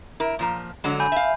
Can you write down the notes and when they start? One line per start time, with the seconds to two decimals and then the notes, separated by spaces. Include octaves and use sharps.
0.20 E4 A#4
0.39 A#2 F3 A#5
0.84 D3 F#3 G#3
1.00 G#5 B5 G6
1.12 E5 F5